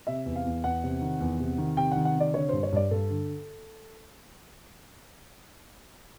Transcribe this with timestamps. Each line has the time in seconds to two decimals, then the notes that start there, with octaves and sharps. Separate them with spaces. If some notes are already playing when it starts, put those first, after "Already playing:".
0.07 C3 E5
0.26 E2
0.36 F5
0.45 E2
0.64 E2 F#5
0.83 C3
1.01 D#3
1.20 E2
1.40 C3
1.58 D#3
1.77 C3 G5
1.91 D#3 F#5
2.05 F#5
2.15 C3 D5
2.33 D3 C#5
2.49 G2 C5
2.63 C#5
2.72 G2 D5
2.91 G2 A4
3.10 D3